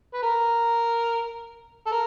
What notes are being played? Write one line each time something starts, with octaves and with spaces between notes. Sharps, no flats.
B4
A#4
A4
A#4